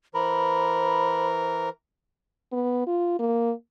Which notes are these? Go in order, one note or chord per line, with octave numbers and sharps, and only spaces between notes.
E3 A#4 C5 B5
B3
F4
A#3